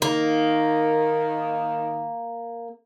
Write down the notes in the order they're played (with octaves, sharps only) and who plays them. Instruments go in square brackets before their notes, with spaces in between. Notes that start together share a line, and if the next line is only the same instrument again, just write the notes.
[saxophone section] D#3 [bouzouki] A#3